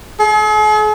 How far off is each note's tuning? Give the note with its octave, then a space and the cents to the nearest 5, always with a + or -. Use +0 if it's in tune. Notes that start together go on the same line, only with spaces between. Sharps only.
G#4 +45